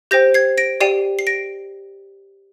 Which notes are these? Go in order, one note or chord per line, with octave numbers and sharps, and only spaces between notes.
G4 C5 G5 G6 A#6
G#6 C7
A#6 D7
G4 D5 G5 C7 D#7
C7
A#6 D7